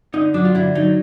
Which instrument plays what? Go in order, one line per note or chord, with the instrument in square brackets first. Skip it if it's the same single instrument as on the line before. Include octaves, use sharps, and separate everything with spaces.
[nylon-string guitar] D3 [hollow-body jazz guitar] D#4
[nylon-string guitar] F#3 [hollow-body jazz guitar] D4
[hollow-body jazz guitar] F4
[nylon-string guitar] D3 [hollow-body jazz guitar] E4
[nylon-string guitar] F#3 [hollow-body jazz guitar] D#4